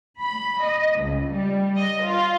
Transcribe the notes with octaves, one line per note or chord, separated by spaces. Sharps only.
B5
D#5
C#2
G3
D#5
F4